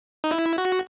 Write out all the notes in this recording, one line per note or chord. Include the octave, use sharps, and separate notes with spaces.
D#4
E4
F#4